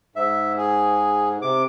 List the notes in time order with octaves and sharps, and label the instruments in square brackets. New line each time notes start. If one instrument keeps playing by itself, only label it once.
[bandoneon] G#2 [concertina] E5
[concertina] G#4
[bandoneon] C3 D6